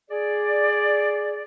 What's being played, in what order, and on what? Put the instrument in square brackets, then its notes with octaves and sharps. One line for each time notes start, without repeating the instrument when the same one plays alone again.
[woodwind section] G#4 D5